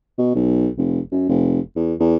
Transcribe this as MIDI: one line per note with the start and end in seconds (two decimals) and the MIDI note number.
0.18 0.30 47
0.35 0.69 35
0.78 1.00 29
1.12 1.24 42
1.29 1.60 29
1.76 1.94 40
2.00 2.16 40